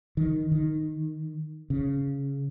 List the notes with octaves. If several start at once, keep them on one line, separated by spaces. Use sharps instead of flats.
D#3
D#3
C#3